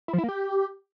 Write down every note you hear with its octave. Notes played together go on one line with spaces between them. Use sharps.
E4
F3
E4
A#3
G4